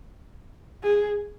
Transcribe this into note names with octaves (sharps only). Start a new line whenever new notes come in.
G#4